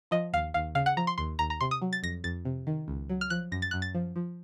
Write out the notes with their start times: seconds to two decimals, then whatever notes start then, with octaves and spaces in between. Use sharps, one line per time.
0.11 F3 D#5
0.33 D#2 F5
0.54 D#2 F5
0.75 C#3 F5
0.86 F#5
0.97 F3 A#5
1.07 C6
1.18 D#2 C6
1.39 D#2 A#5
1.50 A#5
1.61 C3 C6
1.71 D#6
1.81 F#3
1.93 A6
2.03 F2 A#6
2.24 F2 A6
2.45 C3
2.67 D#3
2.88 C#2
3.09 F#3
3.21 F6
3.30 F3 F#6
3.52 F#2 A#6
3.62 A6
3.71 F#2 F#6
3.82 A6
3.95 F3
4.16 F3